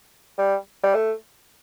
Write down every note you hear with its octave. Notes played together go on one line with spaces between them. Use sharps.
G3
G3
A3